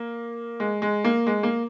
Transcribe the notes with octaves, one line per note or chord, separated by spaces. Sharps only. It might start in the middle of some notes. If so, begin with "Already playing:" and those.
Already playing: A#3
G#3
G#3
A#3
G#3
A#3